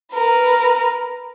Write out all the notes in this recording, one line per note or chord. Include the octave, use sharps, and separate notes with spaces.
A#4 B4